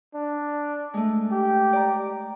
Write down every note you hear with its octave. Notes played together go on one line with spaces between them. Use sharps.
D4
G#3 A3
G4
D5 A#5